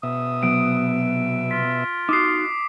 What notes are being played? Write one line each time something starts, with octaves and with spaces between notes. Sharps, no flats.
B2 E5 D#6
C3 F#3 B3 D7
F4 B6
D#4 F#4 D6 D#6 C7